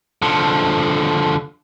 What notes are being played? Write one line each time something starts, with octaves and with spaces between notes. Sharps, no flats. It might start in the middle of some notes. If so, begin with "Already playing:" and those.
D3 F3